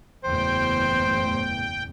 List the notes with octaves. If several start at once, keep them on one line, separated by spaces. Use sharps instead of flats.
F#1 E2 A2 C5 G5